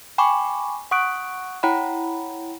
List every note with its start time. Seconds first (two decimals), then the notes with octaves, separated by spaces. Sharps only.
0.18 G5 G#5 B5 C#6 D6
0.91 F#5 C#6 D#6 F#6 D7
1.63 E4 C#5 F#5 G5 A#5 B5